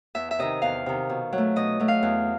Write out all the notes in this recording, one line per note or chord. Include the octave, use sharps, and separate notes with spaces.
E2 E5
E5
C3 D#3 D#5
E2 F5
C3 D#3
B2
F#3
A3
B2 D#5
F#3 A3
F5
E2